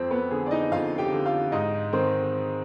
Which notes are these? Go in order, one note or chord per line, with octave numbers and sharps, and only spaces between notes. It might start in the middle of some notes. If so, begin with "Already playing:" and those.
Already playing: F2 C4 C5
B3 B4
D3 G#4
D5
D#4 D#5
F2 F4 F5
G4 G5
D3
F4 F5
G#2 D#4 D#5
D#3 C4 C5